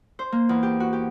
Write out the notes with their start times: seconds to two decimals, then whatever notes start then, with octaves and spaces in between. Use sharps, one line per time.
0.19 C5
0.32 A#3
0.49 E2
0.63 G4
0.80 F#4
0.93 G4